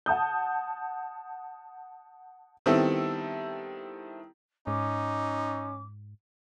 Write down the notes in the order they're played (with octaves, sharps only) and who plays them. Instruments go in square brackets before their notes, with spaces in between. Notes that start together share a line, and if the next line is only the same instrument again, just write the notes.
[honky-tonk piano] F#5 A5 D#6 G6
D#3 G3 B3 C4 E4 A4
[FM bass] G#2 [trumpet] C#4 [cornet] D#4 [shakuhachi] D6